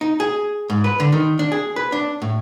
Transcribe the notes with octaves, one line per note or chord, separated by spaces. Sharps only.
D#4
G#4
G#2
B4
D3
D#3
D4
G#4
B4
D4
A2